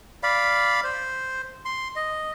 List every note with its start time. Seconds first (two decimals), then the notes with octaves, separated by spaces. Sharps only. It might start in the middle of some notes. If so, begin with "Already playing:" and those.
0.23 D5 F5 B5
0.84 C5
1.65 C6
1.96 D#5